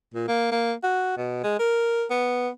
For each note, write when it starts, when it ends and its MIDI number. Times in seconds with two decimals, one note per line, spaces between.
0.14 0.27 46
0.28 0.48 58
0.51 0.73 58
0.83 1.14 66
1.17 1.43 47
1.43 1.58 56
1.59 2.05 70
2.10 2.49 59